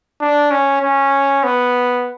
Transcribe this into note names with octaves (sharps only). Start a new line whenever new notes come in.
D4
C#4
C#4
B3